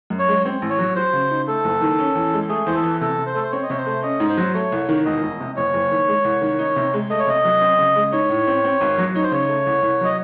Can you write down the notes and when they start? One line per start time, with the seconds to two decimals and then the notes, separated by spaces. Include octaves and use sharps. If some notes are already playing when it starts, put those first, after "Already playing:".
0.10 F#2
0.19 C#5
0.28 G#3
0.45 C4
0.62 A1
0.70 C#5
0.79 F#3
0.96 F#4 C5
1.13 C#3
1.30 D#4
1.47 A3 A4
1.64 F#1
1.81 D#3
1.99 C#4
2.15 E2
2.33 G#3
2.49 A3 G#4
2.66 E2 C5
2.75 A4
2.84 E3
3.01 C3 A4
3.18 C3
3.26 C5
3.34 A3 A4
3.43 C5
3.52 C4 C#5
3.63 D#5
3.70 C3 C#5
3.78 C5
3.86 A3
4.03 C#4 D#5
4.20 G#2
4.29 C5
4.37 F#3
4.54 A3 C#5
4.72 C2
4.89 D#3
5.05 E1 D#5
5.23 E1
5.40 C3
5.56 F#1 C#5
5.74 F#1
5.91 D#3
6.08 G#3
6.24 C2
6.42 D#3
6.59 D#4
6.76 C3
6.94 G#3
7.10 A3 D#5
7.19 C#5
7.27 C3 D#5
7.45 F#3
7.61 C4
7.78 C#3
7.96 G#3
8.12 D#4 C#5
8.29 A2
8.47 C4
8.64 C4
8.81 G#1
8.98 F#3
9.15 D#4 C#5
9.23 C5
9.31 C#3 C#5
9.49 A3
9.66 C2
9.83 C2
10.01 F#3 D#5